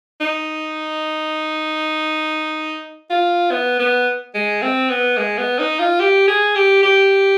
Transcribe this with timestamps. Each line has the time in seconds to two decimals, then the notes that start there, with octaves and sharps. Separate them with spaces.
0.21 D#4
3.10 F4
3.52 B3
3.80 B3
4.35 G#3
4.62 C4
4.90 B3
5.18 G#3
5.38 B3
5.59 D#4
5.79 F4
6.00 G4
6.28 G#4
6.56 G4
6.83 G4